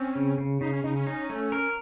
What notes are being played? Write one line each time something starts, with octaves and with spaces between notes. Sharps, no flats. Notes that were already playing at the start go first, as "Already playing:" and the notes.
Already playing: C4 C#4
C#3
C#3
C#3 D#4
C#4
C#3 D#4
C#4
D#4
A3
A#4